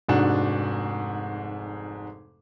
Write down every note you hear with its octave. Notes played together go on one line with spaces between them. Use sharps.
F1 G#2 D4 F#4